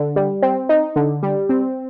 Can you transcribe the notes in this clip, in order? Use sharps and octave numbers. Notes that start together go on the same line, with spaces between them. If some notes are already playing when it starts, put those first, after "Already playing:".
Already playing: D3
G3
C4
D#4
D3
G3
C4